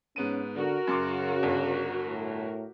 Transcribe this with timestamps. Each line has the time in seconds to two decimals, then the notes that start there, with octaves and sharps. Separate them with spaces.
0.16 G#2 B3 C#4 D#7
0.55 D3 F#4 A#4
0.87 F#2 C#3 C6 D6
1.43 G1
2.06 A2